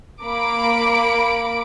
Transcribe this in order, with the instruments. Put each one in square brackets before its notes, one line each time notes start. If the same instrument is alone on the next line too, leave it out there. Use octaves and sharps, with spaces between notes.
[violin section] A#3 B5 D6 D7